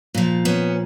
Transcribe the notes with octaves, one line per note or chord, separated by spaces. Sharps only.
A#2 F3
B3 C#4